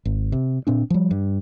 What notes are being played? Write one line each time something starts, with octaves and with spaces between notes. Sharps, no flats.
G#1
C3
A#2 C4 D4
F3 G3
G2